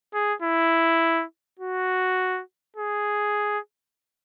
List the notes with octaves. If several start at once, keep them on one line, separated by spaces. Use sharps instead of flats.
G#4
E4
F#4
G#4